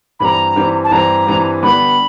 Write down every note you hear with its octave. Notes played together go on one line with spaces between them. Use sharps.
G2 E3 G3 C4 A#5 B5
G2 E3 G3 C4
A5
G2 E3 G3 C4 A#5
G2 E3 G3 C4
D3 G3 B3 B5